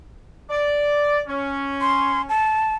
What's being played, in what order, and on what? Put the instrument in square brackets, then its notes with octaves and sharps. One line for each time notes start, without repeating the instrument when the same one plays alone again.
[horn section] D5
C#4
[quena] C6
A5